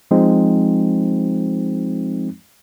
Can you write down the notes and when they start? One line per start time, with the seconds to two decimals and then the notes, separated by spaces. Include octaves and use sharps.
0.11 F3 G#3 C4 D#4